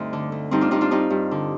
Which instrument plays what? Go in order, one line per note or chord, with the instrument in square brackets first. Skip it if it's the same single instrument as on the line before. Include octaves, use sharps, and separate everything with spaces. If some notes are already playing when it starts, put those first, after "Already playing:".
Already playing: [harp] D2 G2 C4 D#4
D3
D2
G2 C4 D#4
D4 F4
G2 C4 D#4
D4 F4
G2 C4 D#4
G2
D3